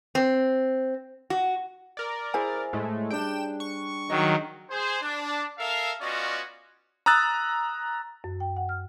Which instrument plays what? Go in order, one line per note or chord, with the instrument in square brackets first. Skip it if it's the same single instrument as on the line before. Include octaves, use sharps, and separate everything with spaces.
[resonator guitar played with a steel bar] C4
F#4
[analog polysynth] A#4 D5
[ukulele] E4 C5 G#5 [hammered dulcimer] G#4
[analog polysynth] A2 G#3 A3
[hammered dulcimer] G3 D4 [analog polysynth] G5 E7
[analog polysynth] C#6
[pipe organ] D#3 F#3 [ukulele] D#5
[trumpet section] G#4 C5
D4
A4 A#4 E5 F5
B3 C#4 F4 F#4 D5 D#5
[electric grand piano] A#5 D#6 E6 F#6 A6
[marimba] F#2
G5
F#5
F6